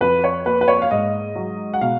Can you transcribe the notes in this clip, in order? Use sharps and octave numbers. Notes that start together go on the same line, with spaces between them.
F2 B4
C#5
A#3 B4
B4
C#5
F5
G#2 D#5
F#3
F#5
B2 F5